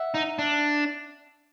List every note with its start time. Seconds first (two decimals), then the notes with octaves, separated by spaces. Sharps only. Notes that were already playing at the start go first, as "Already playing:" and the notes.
Already playing: E5 F#5
0.14 D#4
0.39 D4